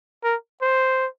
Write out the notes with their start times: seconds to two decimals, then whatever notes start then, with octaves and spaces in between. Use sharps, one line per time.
0.24 A#4
0.62 C5